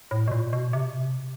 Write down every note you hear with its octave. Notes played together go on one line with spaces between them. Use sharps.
A2
B2
A#2
B2
C3